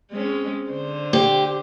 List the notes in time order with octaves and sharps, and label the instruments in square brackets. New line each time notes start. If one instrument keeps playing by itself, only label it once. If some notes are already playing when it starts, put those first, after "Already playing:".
[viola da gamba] G#3 C4 C#4
D3 C5
[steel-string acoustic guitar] G4